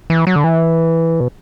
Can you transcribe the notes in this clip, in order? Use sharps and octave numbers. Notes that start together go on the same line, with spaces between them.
E3
F#3
D3
E3
B2